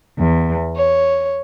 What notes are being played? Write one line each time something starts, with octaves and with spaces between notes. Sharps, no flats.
E2
C#5